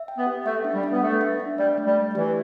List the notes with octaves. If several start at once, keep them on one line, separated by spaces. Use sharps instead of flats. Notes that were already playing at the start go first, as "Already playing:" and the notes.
Already playing: E5
G5
B3
G4
A3 E5
D4
G3
D4
B3
A3 B4
E5
D4
G3 D5
A3
G3
A3
E3 G4